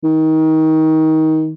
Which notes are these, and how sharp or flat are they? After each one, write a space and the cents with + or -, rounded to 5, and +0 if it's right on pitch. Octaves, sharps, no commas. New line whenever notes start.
D#3 +25